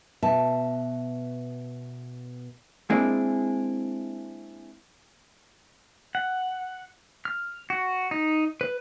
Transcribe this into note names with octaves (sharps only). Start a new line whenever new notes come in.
B2 E5 A5
G#3 A#3 C4 D4 E4 G#4
F#5
F6
F#4
D#4
B4